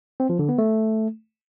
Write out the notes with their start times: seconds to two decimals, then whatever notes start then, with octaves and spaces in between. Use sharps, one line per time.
0.20 C4
0.29 F3
0.39 D3
0.49 B3
0.58 A3